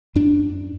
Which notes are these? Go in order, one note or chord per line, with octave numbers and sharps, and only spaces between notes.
F#2 D4